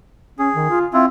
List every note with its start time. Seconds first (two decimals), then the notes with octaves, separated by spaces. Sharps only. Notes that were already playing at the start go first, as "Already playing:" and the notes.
0.39 C#4 G#4
0.55 D#3
0.70 F4
0.93 C4 E4 F4